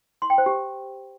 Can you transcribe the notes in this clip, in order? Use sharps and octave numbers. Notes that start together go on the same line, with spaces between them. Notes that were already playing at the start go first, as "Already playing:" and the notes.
C6
G5
C5
G4